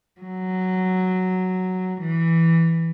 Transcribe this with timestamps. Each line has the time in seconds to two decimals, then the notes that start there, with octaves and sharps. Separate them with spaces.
0.21 F#3
2.00 E3